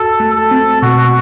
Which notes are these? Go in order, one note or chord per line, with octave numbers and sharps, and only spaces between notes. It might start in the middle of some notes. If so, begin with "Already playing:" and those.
Already playing: F#4 A4
A3
A4
C4
B2 F#4